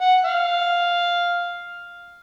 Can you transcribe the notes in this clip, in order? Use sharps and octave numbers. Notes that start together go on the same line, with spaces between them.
F#5
F5